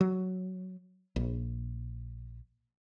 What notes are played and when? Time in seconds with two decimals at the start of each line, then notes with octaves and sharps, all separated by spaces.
0.01 F#3
1.16 A#1